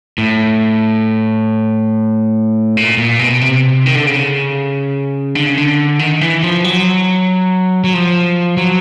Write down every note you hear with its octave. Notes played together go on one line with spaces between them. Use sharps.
A2
A#2
A#2
B2
C3
D#3
D3
C#3
D3
C#3
D3
D#3
E3
F3
F#3
F#3
F3
F#3